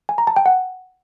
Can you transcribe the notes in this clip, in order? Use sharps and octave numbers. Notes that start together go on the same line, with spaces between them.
G#5
A#5
A5
G5
F#5